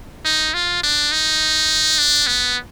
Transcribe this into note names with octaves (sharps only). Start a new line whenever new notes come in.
D#4
F4
D4
D#4
D4
B3